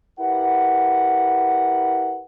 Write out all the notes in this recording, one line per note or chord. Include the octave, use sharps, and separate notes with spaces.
E4 G4 A#4 B4 F#5